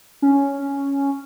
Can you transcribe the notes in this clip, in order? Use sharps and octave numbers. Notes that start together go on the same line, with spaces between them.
C#4